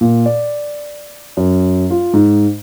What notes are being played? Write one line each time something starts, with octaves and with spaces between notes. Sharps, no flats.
A#2
D5
F#2
F4
G#2